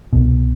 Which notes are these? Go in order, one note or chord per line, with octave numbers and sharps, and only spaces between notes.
C2 B2